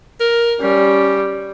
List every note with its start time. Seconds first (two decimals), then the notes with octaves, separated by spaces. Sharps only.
0.20 A#4
0.61 G3 C#4